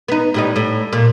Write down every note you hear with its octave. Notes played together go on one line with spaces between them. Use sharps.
B3 D#4
A2 G3 D#4
A2
A#2